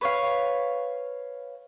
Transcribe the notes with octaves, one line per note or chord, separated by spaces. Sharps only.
B4 C#5 F5